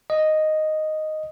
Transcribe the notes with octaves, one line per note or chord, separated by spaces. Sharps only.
D#5